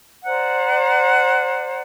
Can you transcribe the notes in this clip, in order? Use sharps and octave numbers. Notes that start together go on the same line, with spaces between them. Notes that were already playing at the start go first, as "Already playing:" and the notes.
C5 D5 F#5 A#5